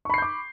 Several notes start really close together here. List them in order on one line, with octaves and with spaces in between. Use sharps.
C#6 B5 C7 G6 D6